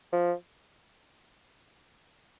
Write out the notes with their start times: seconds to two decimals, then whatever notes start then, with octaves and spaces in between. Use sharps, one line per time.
0.12 F3